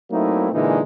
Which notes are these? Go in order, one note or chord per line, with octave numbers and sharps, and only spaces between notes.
F#3 A3 A#3 C4 D#4 E4
A#2 D3 E3 G#3 D4 D#4